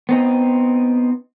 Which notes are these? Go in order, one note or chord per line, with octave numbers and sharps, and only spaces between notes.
B3 C4 D#4